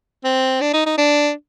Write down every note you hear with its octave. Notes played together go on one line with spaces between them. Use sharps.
C4
D4
D#4
D#4
D4